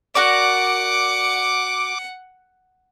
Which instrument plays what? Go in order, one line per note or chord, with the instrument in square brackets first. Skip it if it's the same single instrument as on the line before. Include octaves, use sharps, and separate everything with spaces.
[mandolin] F#4 A#4 D5 [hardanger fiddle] F#5 [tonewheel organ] D6